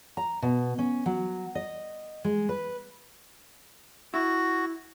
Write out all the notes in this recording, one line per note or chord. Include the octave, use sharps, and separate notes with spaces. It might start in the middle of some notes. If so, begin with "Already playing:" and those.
A#5
B2
C#4
F#3
D#5
G#3
B4
E4 F#4